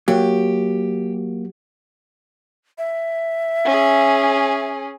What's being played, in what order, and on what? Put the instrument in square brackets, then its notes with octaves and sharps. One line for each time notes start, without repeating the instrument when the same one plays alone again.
[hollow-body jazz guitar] F#3 [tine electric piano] A#3 [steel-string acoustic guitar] G4
[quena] E5
[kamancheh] C#4 G#4